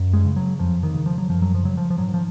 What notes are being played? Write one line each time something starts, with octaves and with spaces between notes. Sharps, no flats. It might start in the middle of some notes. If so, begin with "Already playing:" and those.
Already playing: F#2
G#3
C#3
F#3
F2 F3
D#3
C#3
F3
F#3
F#2 F3
F#3
F3
C#3 F#3
F3
F3
G#2 F#3
F3